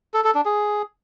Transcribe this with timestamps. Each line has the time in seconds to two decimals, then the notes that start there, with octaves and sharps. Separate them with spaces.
0.14 A4
0.24 A4
0.35 D4
0.45 G#4